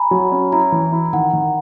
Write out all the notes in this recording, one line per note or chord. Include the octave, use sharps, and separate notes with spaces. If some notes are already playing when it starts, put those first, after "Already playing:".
Already playing: G#5 A#5 B5
F#3
C#4
E4 A#5
E3
E4
D#3 F#5
D#3